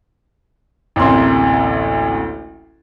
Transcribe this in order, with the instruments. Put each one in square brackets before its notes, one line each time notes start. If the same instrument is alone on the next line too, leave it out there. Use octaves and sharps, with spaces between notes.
[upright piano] A1 D2 C3 A#3 C6